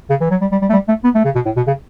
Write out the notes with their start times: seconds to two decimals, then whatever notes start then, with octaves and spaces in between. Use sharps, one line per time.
0.10 C#3
0.21 E3
0.31 F#3
0.41 G3
0.52 G3
0.62 G3
0.69 A3
0.73 G3
0.88 A3
1.04 B3
1.15 A3
1.25 C#3
1.35 B2
1.45 A2
1.56 B2
1.67 C#3